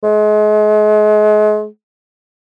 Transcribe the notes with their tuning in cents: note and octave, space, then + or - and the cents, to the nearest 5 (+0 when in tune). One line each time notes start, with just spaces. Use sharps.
G#3 +35